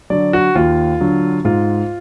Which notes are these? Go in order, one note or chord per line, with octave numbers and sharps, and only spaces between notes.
D3 F#3 D5
F#4
D#2 F4
D3 F#3
G#2 F4